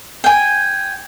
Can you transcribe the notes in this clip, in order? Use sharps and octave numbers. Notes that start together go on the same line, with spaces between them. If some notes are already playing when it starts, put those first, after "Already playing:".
G5 G#5